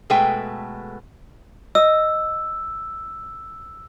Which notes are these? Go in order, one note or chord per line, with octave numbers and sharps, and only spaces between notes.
B2 G#3 A3 B4 G5
D#5 E6